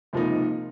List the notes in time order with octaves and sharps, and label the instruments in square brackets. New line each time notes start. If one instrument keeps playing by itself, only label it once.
[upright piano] C#2 C3 F3 A#3 D#4